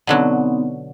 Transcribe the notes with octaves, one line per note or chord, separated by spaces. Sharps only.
B2 D3 F#3 B3 C4 D#4